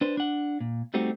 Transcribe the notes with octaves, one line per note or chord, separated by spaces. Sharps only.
D4 B4 C5
D4 F#5
A#2
G3 A3 C4 D#4 F#4 G4